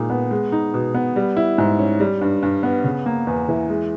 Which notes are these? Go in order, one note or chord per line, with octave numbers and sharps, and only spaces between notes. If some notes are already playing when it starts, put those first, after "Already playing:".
Already playing: A#2 G#3 D#4
B3
G#3
D#4
B2
B3
G3
E4
G#2
C#4
G3
G2
G2
B3
C#3
A#3
E2
E3
G#3